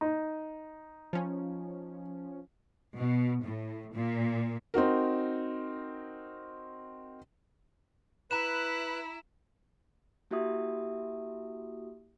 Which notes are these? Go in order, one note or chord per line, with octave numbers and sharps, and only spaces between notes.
D#4
F3 C#4
B2
A2
A#2
C4 D#4 F#4 A#4
E4 B4 A#5 F#6 E7
A#3 E4 F#4 G4 E5 D#6